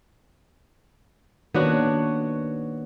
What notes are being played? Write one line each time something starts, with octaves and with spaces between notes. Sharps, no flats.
D#3 A#3 B3 D4 F#4 C#5